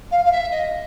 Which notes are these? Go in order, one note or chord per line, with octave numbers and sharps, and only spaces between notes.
F5
F5
E5
D#5